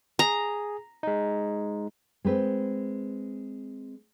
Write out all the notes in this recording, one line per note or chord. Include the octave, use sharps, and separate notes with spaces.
G#4 A#5
G#3 D#4
G#3 C4 B4